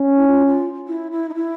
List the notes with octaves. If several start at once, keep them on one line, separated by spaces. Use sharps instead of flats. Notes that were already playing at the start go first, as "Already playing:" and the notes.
Already playing: C#4
E4
F4
F4
E4
E4
D#4
E4